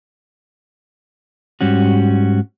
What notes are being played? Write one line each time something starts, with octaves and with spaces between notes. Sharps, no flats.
G#2 G3 C#4 F#4